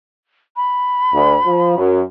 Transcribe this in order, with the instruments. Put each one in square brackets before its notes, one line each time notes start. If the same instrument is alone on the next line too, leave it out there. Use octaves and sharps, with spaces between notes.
[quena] B5
[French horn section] D2
F3
F#2